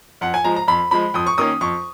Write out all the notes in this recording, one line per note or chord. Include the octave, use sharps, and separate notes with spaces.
F2 F#5
G#5
F3 G#3 A#5
A#5
F2 B5
F3 G#3 B5
F2 D#6
C#6
D#3 A#3 C#4 D#6
F2 C#6